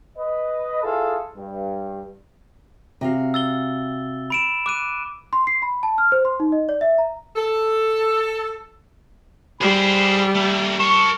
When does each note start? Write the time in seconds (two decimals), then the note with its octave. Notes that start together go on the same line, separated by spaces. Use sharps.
0.18 B4 D#5
0.83 E4 F4 G#4 A4
1.36 G2
3.01 C3 F#4 F5
3.34 E6 A6 G7
4.30 B5 D7 E7
4.66 D6 F#6 D#7
5.33 C6
5.47 C7
5.62 B5
5.83 A5
5.98 F6
6.12 C5
6.25 C6
6.40 D#4
6.52 D#5
6.69 D5
6.81 E5
6.98 A#5
7.36 A4
9.61 G3 G#4 C5 B5
10.35 A3 A#3
10.80 A#4 A5 C#6